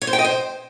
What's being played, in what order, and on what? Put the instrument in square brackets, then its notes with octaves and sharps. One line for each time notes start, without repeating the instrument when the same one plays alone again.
[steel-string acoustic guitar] C#5
C5
G5
D#5
C5